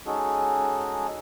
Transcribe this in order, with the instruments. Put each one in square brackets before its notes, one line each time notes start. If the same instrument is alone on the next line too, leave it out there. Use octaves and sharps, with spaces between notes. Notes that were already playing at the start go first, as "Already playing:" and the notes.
[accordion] G#3 C#4 D#4 F#4 G#4 A4